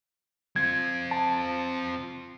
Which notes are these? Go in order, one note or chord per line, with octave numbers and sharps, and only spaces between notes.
C4 F4 G#6
A5